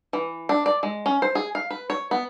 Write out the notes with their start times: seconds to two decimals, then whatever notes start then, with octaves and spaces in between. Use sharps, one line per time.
0.13 E3
0.49 D4
0.66 D5
0.83 G#3
1.06 C#4
1.22 C5
1.35 G#4
1.55 F5
1.71 B4
1.90 C#5
2.11 B3